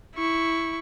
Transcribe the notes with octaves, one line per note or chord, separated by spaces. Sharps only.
E4 C#6